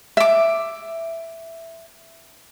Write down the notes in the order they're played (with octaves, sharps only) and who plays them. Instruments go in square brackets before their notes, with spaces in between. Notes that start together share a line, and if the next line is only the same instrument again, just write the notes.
[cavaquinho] E5 D6